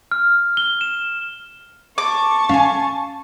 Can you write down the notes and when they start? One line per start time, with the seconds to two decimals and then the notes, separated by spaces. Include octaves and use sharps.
0.11 F6
0.57 G7
0.81 E7
1.98 A5 C#6 D6
2.49 C#4 F5 G#5